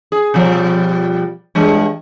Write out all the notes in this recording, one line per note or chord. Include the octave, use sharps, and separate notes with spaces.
G#4
B2 F3 G3
G2 E3 G#3